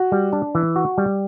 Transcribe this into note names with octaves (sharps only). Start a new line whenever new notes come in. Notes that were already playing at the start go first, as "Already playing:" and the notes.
Already playing: F#4
G3
D4
E3
F#4
G3